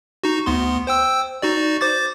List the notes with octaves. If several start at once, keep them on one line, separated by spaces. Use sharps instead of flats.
D#4 F#4
D2 B3 C6
C5 G5 E6
D#4 F#4 D5
C5 D6 A6